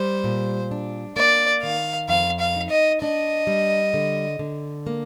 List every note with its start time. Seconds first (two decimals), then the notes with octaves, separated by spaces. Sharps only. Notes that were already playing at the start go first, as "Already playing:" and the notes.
Already playing: G3 C5
0.24 A#2
0.71 D4
1.16 A#3 D5
1.63 D#3 F5
2.09 F2 F5
2.39 F5
2.56 D#4
2.70 D#5
3.02 D4 D#5
3.47 G3
3.94 D3
4.39 D3
4.87 A#3